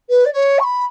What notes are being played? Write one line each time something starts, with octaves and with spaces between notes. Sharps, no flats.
B4
D5
C#5
C#6
B5